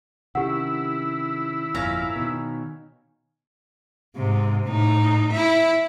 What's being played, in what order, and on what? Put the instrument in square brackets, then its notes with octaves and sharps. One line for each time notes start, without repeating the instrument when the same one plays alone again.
[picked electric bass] C3 D#3 C#4 [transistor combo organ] E4 [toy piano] G4 F#5
[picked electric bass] G1 F2 A#2 [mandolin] C#4 F5 A#5
[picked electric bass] B2 D#3
[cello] G#2 C3
A2 D#4
E4 E5